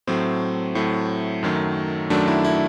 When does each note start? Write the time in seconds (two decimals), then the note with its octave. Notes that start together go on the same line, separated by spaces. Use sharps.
0.07 A2 F#3 A3 C4
0.75 A2 F#3 A3
1.43 F#2 D#3 F#3 A3
2.10 F#2 D#3 F#3 A3 D4
2.28 E4
2.45 E4